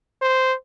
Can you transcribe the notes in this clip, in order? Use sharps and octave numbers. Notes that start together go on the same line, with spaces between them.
C5